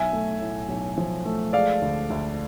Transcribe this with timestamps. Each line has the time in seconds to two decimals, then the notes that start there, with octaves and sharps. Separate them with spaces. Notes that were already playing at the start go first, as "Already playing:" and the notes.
Already playing: B1 E5 G#5
0.13 A3
0.40 A2
0.69 B1
0.98 F3
1.25 A3
1.53 G#3 D5 F5
1.82 D2
2.10 D2